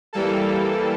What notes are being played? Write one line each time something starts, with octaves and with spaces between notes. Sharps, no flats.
E3 G3 A#3 A4